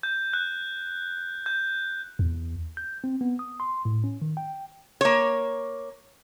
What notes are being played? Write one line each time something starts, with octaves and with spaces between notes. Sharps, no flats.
G6
F#6
G6
E2
G6
C4
B3
D#6
C6
A2
C#4
D#3
G5
A#3 C#5